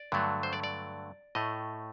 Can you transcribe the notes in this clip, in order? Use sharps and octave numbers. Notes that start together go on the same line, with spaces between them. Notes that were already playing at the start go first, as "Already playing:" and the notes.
Already playing: D5
G2 D3 F#3 A3
C5
D5
D5
A2 A3 D#5